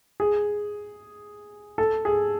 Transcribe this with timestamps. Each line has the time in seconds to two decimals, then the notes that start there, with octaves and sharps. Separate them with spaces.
0.20 G#4
1.78 A4
2.05 G#4